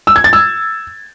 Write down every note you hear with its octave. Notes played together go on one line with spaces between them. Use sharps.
E6
G#6
A6
E6